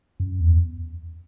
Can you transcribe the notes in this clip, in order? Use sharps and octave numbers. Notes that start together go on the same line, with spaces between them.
F#2
E2